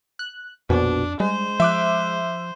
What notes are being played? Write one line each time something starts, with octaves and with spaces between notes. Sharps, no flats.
F#6
A#1 F2 B2 D4
G3 G#3 C5
F3 E5 D6 F#6